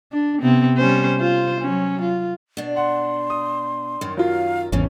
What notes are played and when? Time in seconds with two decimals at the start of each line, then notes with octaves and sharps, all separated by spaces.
0.12 D4
0.42 C3 B3 C4
0.77 G3 C#4 C5
1.20 F4 C5
1.61 F#3 C#4
2.02 F4
2.57 B2 D4
2.76 F#5 C6
3.30 D#6
4.01 F#2 D#3
4.17 F#3 F4 F5
4.72 G#1 E2 A2 C#3 F3 C#4